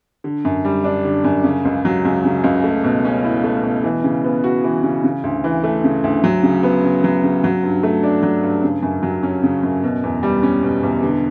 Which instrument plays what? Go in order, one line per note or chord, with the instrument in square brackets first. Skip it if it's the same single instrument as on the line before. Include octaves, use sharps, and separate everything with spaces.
[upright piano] D3
F#2
G3
D4
D3
F#2
C#3
C#2
F#3
C#2
C#3
C#2
A3
B2
C#4
E4
A3
B2
E3
C#3
B3
F#4
E3
C#3
C#3
D2
E3
A3
C#3
D2
F#3
C#3
B3
C#3
F#3
C#3
F#3
G2
A3
D4
F#3
G2
C#3
F#2
F#3
C#4
C#3
F#2
B2
E2
G3
C#4
B2
E2
D3